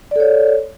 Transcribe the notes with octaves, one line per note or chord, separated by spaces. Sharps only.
A4 C#5 D5